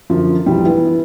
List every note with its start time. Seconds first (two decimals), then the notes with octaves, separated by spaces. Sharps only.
0.10 F#2 D3 F3
0.46 B1 E3 F3 G3
0.65 E3 B3